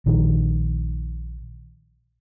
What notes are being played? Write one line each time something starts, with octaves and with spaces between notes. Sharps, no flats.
A#1 D#3